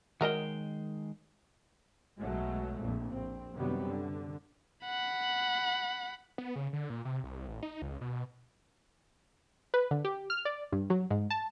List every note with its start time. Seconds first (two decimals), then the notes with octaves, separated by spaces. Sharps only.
0.21 D#3 F#3 G#3 A#4 D#5 G5
2.19 B1 B2 F#3 G#3 A3
2.80 A#1 F2 A#2
3.10 A#1 C4
3.54 F#2 C3 D#3 F#3 G3 B3
3.86 D3
4.85 F#5 B5
6.38 B3
6.56 C#3
6.73 D3
6.90 A#2
7.05 C3
7.24 C2
7.48 A1
7.63 D#4
7.82 C#2
8.01 B2
9.74 B4
9.91 D3
10.05 G4
10.30 F6
10.45 D5
10.72 G2
10.90 F#3
11.10 G#2
11.30 A5